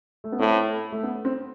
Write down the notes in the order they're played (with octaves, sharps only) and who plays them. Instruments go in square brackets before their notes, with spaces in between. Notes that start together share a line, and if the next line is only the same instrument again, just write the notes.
[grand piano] A3
B3
[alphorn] A2 [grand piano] C4
[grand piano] A3
B3
C4